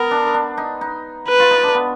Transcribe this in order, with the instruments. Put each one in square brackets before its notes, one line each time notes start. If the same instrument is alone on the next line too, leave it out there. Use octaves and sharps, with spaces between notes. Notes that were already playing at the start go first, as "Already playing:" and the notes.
Already playing: [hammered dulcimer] B3 [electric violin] A#4
[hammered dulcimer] D4
D4
D#4
D#4
[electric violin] B4
[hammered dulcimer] F4
D#4
D4
B3